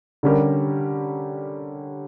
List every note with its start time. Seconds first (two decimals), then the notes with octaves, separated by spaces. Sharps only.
0.23 D3 G3 C#4 G4 A#4